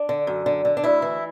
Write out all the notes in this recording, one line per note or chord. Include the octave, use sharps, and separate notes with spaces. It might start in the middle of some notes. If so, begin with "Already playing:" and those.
Already playing: D4
D3
F#2
D3
D3
D4
D2 E4
E3